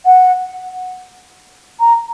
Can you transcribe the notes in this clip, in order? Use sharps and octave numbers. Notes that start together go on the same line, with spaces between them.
F#5
A#5